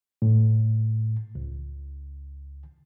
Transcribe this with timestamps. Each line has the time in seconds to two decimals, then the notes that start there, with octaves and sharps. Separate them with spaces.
0.22 A2
1.35 C#2